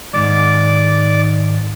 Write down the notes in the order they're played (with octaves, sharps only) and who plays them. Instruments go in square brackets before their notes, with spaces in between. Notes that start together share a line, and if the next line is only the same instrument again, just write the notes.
[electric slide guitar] G#2 D#3 G#3 [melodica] D5 D6